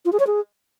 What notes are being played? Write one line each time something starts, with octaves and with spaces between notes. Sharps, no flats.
F4
G#4
C#5
G#4